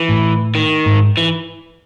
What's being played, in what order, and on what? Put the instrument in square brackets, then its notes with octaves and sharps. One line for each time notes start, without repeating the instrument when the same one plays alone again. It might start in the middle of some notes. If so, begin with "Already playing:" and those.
Already playing: [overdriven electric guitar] E3
[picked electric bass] A2
[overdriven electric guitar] D#3
[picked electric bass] G#2
[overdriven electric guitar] E3